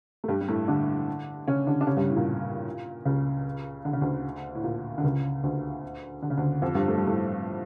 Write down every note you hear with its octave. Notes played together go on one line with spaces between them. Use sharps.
A3
G2 G3
G3
A2 A3
D3 D4
C#3 C#4
D3 D4
D4
C#3 C#4
G2 G3
A2
A#2
C#2 C#3
D3
C#3
D2 D3
A2
A#2
D3
C#2 C#3
D2 D3
D3
C#3
D2 D3
F2 F3
G2 G3
A3
G3
A2 A3